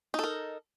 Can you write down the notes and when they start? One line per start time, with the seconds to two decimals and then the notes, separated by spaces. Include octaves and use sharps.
0.14 D#4
0.19 A4
0.23 A#4